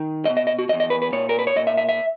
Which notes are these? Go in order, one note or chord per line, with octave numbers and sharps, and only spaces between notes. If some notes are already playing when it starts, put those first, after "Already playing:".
Already playing: D#3
E2 D#5
B2
D#5
D#5
F#4
B2 D#5
E2
D#5
B4
B4
A#2 C#5
A#4
B4
C#5
A#2 D#5
E5
E5
E5